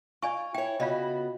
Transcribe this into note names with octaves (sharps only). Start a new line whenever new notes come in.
F4 D5 G#5 C#6
E4 C#5 G5
C#3 B3 F4 F#4 D5 D#5